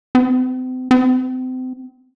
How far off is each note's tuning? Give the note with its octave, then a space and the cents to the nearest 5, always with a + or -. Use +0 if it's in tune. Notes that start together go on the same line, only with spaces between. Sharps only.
C4 -40
C4 -35